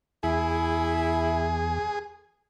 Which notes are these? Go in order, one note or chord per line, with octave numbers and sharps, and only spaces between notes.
E2 E4 G#4